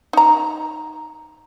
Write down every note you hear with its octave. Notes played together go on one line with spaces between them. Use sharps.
D#4 A#5